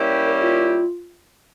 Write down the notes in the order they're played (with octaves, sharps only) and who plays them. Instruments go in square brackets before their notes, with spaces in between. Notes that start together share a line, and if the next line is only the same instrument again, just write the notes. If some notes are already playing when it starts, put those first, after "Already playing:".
Already playing: [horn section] G3 A#3 C#4 E4 G4
[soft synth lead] C#5
A#4
F4